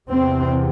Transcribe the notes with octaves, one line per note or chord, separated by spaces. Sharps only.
E2 C3 C4